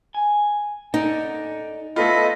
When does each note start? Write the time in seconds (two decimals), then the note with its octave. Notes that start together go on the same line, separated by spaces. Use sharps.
0.14 G#5
0.94 D#4 A4 D5
1.96 A3 B3 F4 A4 D#5 B5